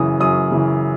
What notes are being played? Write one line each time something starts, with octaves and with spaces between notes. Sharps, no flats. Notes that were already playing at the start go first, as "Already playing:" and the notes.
Already playing: F#2 C#3 E3 D#6
F#2 D#6
C#3 E3